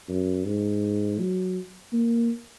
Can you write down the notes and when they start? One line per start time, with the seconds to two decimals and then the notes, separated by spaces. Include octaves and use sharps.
0.09 F#2
0.46 G#2
1.20 F#3
1.93 A#3